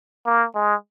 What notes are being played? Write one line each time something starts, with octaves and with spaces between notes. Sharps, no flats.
A#3
G#3